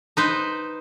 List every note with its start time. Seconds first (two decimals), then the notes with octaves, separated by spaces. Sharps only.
0.17 D#4 B4 C5